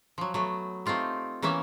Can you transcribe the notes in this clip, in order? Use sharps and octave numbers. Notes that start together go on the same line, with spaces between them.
F3 F#3
F#3 A3 B3
A3 C4 D#4 F4 G4
E3 A#3 B3 C#4 E5